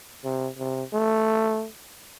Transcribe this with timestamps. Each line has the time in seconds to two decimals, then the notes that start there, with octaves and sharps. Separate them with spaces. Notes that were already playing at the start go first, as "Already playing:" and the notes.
0.24 C3
0.59 C3
0.93 A3